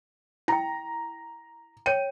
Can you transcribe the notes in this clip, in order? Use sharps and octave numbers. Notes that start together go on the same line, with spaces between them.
E4 G5 A#5
C#5 G5 D#7